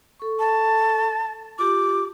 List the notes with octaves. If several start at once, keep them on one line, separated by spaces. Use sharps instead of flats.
A4 C#6
A5
F4 G4 D6